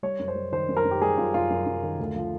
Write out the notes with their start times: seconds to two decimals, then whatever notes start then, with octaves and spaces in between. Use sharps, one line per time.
0.03 G3 C#5
0.19 F#2
0.28 C5
0.35 G3
0.52 D#3 C5
0.69 F#2
0.77 A#4
0.85 F#2
0.91 G4
1.02 G3 G#4
1.17 F#2 F4
1.34 F#2 F4
1.50 F#2
1.66 F#2
1.83 D#3
1.99 D2
2.16 F3